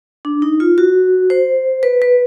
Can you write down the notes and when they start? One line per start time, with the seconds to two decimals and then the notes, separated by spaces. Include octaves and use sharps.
0.25 D4
0.42 D#4
0.60 F4
0.78 F#4
1.30 C5
1.83 B4
2.02 B4